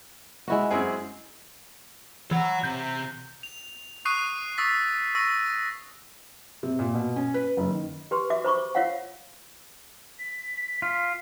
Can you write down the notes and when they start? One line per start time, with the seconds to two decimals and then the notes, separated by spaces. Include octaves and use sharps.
0.48 G#3 E4 F#4
0.71 F#2 C4 G#4
2.31 E3 C#5 F#5
2.64 C3 G6
3.43 F7
4.05 C#6 D#6 F#6 C7 D#7
4.58 C#6 D#6 E6 A6 B6
5.15 C#6 E6 A#6 D#7
6.63 C3
6.79 A#2
6.94 B2
7.16 C#4
7.34 B4
7.57 F#1
7.71 D#3
8.11 G4 B4 C6
8.30 F#4 E5 D6
8.44 C5 B5 C#6 D6
8.75 F4 C#5 F5 F#5
10.19 B6
10.82 F4